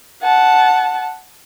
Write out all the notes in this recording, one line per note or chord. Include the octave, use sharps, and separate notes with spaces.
F#5 A5